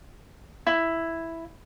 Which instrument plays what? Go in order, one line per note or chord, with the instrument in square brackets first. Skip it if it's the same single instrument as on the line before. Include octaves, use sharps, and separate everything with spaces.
[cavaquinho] E4